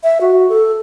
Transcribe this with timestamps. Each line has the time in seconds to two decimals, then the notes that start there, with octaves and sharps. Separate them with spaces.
0.03 E5
0.21 F#4
0.49 A4